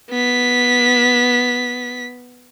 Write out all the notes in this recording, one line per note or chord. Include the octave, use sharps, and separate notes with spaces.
B3 B6